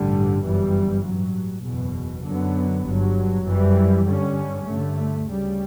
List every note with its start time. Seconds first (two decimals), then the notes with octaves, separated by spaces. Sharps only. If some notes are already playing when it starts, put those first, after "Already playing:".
Already playing: A1 G2 D3 G3
0.44 G1 F#2 E3 G3
1.05 A1 G2 F#3
1.64 F#1 E2 B2
2.26 F#2 D3 F#3 B3
2.85 G1 G2 F#3
3.46 F#2 E3 G3
4.05 G2 D3 G3 C#4
4.65 G2 D3 A3
5.27 D2 C#3 G3